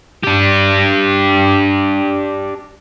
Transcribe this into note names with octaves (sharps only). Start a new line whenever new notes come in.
D4 G4